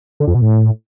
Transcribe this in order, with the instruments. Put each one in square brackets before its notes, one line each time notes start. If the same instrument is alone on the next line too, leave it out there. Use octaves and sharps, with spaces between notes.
[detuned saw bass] D3
F2
B2
A2